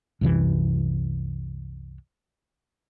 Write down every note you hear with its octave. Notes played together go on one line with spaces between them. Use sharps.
C2 F#2 C3 E3